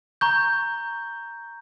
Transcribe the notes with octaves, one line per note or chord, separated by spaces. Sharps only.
A#5 C#6 G6